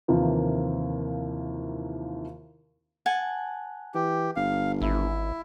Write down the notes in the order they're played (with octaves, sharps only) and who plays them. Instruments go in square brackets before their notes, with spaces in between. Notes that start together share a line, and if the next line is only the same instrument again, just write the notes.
[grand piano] D#2 C3 E3 F3 A#3
[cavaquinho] F#5 G#5 A5
[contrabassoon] E3 [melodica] G4
[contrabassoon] G1 [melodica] F5
[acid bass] G#1 [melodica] E4